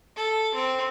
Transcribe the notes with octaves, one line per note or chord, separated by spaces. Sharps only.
A4
C4